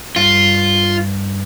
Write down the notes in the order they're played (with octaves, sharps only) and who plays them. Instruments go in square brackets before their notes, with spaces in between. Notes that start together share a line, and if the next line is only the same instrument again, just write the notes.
[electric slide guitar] G2 [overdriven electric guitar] F4